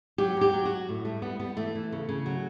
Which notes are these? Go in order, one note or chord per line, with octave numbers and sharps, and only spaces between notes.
F#3 G4
F#3 G4
F#3
F#4
F#3
A2
G3 A3
G3 B3
G3 B3
E3 A3
E3
C#3
C#3
F#3